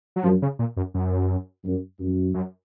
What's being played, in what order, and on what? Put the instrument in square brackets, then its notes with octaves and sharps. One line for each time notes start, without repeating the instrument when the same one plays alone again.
[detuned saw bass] F#3
[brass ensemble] F#2 [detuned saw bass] F3
[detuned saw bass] C#3
A#2
F#2
F#2
[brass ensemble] F#2
F#2
[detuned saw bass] F#2